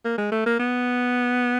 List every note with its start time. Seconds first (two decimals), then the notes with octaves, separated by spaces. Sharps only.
0.04 A#3
0.18 G#3
0.31 A3
0.46 A#3
0.59 B3